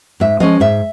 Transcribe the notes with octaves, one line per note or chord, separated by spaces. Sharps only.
G#2 E5
F3 G#3 C#4 D#5
G#2 E5